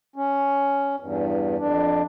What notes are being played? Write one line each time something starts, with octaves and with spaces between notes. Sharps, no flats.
C#4
E2 G2
F2 D4